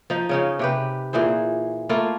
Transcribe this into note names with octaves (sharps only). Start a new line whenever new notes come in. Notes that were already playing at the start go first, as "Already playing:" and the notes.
F3 D#4
C#3 C#4 D#4
C3 G4 B4
A#2 E3 G#4 C5
A3 A#3 E4 F4